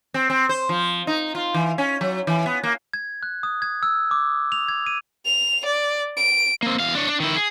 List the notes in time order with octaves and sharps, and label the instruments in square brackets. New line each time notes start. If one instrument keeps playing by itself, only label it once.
[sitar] C4
C4
C5
F3
D#4
F4
E3
C#4
F#3
E3
B3
A#3
[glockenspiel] G#6
F#6
D#6
G#6
E6
D6
F7
G#6
D#7
[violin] F7
D5
D7
[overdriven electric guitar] A#3 C4
E2 F5
D4 C#5
D4
D#3 E4
G#4